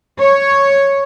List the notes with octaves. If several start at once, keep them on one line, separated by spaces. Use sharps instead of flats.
C#5